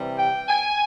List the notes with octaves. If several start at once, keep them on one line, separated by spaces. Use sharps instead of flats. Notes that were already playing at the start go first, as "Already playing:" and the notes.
Already playing: C3 E3 G3
G5
G#5